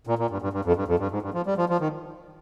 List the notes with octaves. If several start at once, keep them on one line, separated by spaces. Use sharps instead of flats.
A#2
A#2
G2
G2
G2
F2
G2
F2
G2
G#2
G2
F3
G3
F3
F3
D#3